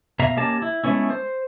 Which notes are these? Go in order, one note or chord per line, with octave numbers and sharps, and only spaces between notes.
B2 E5 F5 A#5
A#3 C#4 G4 D#5 A5
E4
G#3 A3 B3 C#4 E4
C5